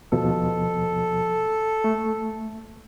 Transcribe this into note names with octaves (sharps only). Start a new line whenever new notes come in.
D#2 B2 F3 A4
A3